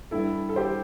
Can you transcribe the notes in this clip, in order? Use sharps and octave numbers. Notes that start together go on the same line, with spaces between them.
G2 G3 E4 A4
A4
G4 C5